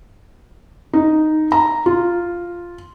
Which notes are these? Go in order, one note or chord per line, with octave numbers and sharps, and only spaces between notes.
D#4
A#5
F4